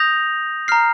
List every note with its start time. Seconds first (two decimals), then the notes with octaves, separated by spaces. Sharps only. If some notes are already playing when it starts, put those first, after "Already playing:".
Already playing: D#6 G6 A#6 F7
0.68 A#5 F6 C7